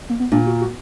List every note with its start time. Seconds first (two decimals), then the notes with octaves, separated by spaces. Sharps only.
0.09 A#3
0.20 B3
0.32 A#2 D4
0.46 F#4
0.61 F#4